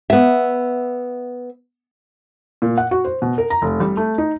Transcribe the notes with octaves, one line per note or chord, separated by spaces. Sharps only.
B3 E5
A#2
F#5
F#4
C5
B2
A#4
A#5
F1
G3
A3
D#4